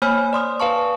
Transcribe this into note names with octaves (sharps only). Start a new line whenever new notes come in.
A#3 C5 C#5 G#5 B5 F6
D5 C6 D#6
B4 F5 A5 C#6